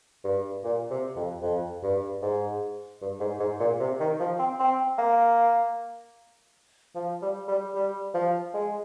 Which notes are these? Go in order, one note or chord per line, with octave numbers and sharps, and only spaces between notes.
G2
A#2
C3
F2
F2
G2
G#2
G2
G#2
G#2
A#2
C3
D#3
F3
C4
C4
A#3
F3
G3
G3
G3
F3
G#3